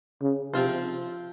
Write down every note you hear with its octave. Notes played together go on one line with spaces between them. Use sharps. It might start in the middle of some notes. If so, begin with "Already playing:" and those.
C#3
C3 F3 G#3 C4 F4 C5